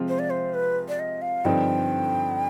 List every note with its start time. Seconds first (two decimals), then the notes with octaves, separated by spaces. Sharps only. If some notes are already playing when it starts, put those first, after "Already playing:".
Already playing: C3 F3 G#3 C4 F4
0.08 C5
0.19 D5
0.30 C5
0.54 B4
0.88 D5
0.99 D#5
1.22 F5
1.45 G2 D3 F3 C4 D#4 G5